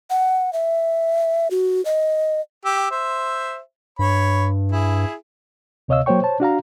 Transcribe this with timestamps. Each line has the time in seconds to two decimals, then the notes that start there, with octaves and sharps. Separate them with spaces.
0.10 F#5
0.53 E5
1.51 F#4
1.85 D#5
2.65 G4 E6
2.91 C5 E5
3.99 G2 C#5 B5
4.72 E4 G#4
5.88 D2 C3 C#5 D#5 F5 E6
6.06 F#3 A#3 C5 C#5 G5 C#6
6.22 C5 C#5 A5
6.40 D4 F#4 F5 A#5